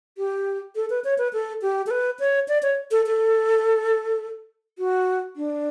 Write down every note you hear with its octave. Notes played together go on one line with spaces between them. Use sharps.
G4
A4
B4
C#5
B4
A4
G4
A4
B4
C#5
D5
C#5
A4
A4
F#4
D4